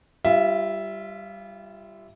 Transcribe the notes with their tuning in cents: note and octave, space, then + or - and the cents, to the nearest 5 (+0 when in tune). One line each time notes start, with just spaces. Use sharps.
G3 +0 F4 -30 E5 +0